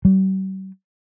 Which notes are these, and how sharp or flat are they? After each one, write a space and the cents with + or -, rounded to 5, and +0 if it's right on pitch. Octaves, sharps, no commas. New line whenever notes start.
G3 -45